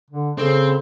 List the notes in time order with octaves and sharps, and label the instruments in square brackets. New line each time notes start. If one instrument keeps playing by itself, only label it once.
[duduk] D3
[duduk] C#3 [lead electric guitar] C4 [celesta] A4